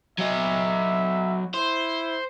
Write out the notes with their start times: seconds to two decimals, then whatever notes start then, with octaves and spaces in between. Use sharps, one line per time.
0.19 F#3 D#5 E5
1.54 E4 C5